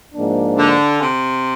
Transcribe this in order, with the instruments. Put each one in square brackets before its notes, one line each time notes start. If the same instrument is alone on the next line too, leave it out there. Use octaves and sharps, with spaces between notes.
[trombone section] G#2 F3 A#3 D4
[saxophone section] D3
C#3
C3